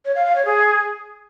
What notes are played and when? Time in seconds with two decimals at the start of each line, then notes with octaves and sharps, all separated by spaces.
0.05 C#5
0.15 F5
0.25 F5
0.35 C#5
0.45 G#4